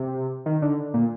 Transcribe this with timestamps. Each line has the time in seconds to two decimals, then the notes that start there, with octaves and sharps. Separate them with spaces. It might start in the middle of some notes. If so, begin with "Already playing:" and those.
Already playing: C3
0.46 D#3
0.62 D3
0.94 A#2